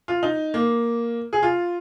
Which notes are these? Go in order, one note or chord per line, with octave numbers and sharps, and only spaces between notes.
F4
D#4
A#3
G#4
F4